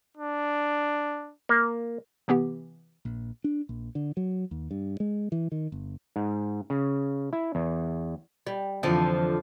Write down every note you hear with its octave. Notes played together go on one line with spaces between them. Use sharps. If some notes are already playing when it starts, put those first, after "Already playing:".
D4
A#3
C3 E3 B3 G4
A#1
D4
A#1
D3
F#3
D#2
G2
G#3
E3
D#3
G1
G#2
C#3
E4
E2
G3
F2 D3 E3 F3